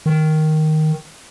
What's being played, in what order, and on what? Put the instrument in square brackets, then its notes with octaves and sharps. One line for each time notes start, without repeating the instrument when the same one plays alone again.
[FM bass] D#3